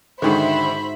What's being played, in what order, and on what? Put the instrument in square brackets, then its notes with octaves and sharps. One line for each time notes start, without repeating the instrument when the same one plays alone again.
[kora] G#2 F#4 C#5 [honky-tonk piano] D3 D#3 [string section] C5 E5 B5